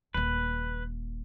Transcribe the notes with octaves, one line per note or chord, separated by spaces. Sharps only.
D#1 A#3 B4